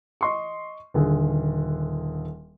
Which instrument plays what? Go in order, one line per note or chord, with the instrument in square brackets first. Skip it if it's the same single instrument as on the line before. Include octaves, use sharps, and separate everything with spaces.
[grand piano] D#5 C6 C#6
D#1 D3 G#4